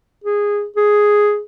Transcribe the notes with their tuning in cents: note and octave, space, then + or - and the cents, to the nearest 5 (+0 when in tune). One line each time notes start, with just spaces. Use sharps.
G#4 -15
G#4 +0